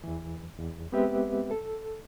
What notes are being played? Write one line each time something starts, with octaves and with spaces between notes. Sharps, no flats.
E2 E3
E2
G#3 B3 C4 G4 B4 E5
A4